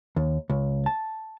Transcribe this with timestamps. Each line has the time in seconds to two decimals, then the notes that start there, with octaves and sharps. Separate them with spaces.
0.16 D#2
0.50 C#2
0.86 A5